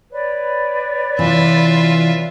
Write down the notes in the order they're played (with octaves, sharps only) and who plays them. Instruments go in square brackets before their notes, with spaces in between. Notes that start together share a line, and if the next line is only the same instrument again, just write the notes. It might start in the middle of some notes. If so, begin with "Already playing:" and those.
[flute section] B4 C#5 D5
[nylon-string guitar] C3 E3 [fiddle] F4 E5